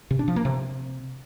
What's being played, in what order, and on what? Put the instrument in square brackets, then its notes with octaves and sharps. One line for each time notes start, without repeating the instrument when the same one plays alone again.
[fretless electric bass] C3
D4
F3
A#3
C3